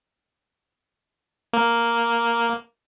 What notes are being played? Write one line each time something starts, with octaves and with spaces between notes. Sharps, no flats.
A#3